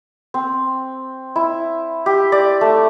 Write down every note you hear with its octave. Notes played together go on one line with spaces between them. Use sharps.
C4
E4
G4
D5
A3